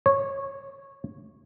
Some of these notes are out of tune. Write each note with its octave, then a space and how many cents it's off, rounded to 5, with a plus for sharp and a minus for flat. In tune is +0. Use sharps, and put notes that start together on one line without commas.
C#5 -15